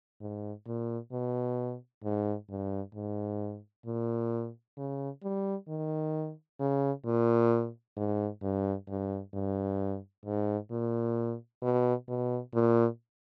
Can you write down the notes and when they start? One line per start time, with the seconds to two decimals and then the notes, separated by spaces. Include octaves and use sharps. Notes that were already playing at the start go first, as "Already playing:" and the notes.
0.21 G#2
0.66 A#2
1.12 B2
2.03 G#2
2.49 G2
2.95 G#2
3.86 A#2
4.77 C#3
5.23 G3
5.68 D#3
6.60 C#3
7.05 A#2
7.97 G#2
8.42 G2
8.88 G2
9.34 G2
10.25 G#2
10.71 A#2
11.62 B2
12.08 B2
12.54 A#2